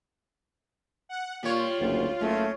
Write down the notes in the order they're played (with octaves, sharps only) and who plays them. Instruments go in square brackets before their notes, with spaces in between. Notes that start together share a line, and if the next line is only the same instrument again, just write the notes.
[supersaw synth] F#5
[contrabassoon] A#2 [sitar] G3 C#5 [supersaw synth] F4
[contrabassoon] F#1 [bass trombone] D2
[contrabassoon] F#1 [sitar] C#3 [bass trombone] A3